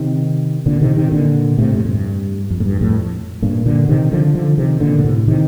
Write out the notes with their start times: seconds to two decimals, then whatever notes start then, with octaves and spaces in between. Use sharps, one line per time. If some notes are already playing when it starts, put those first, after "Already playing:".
Already playing: C3 D#3
0.66 A#2 D3
0.81 C3 D#3
0.96 C3 D#3
1.12 A#2 D3
1.58 A2 C3
1.73 F2 A2
1.85 A2
1.89 G2
2.50 F2
2.60 A2
2.66 G2
2.81 F2 A2
3.42 G2 A#2
3.66 A#2 D3
3.89 C3 D#3
4.12 D3 F3
4.35 D3 F3
4.58 C3 D#3
4.80 A#2 D3
4.99 A#2
5.05 A2 C3
5.27 C3 D#3